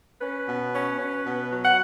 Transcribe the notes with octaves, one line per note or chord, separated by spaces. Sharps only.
C#4 B4
B2
C#4
C#4
B2
F#3
F#5